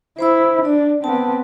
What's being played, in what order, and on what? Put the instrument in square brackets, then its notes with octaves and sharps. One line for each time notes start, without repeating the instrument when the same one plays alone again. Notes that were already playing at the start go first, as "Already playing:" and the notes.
[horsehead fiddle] E4 [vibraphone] C5 B5 E6
[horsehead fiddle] D4 [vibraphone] D5
[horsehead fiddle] B3 C4 [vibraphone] A5